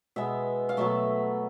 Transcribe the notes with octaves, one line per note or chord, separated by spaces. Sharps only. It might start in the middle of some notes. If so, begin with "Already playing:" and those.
B2 G#3 B3 E5
F5
B2 F#3 A3 E5